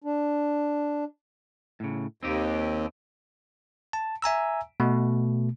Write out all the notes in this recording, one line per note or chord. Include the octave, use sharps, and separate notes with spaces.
D4
A2 C#3
D#2 C4 D#4 G4
A5
E5 G#5 A#5 E6
B2 A3